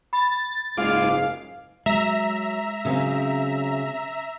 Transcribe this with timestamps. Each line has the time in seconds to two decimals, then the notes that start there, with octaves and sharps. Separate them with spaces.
0.13 B5 A6
0.77 F#1 G#2 G#3 F4 F5 D6
1.86 F#3 G#3 E5 A#5
2.85 C#3 F#3 C4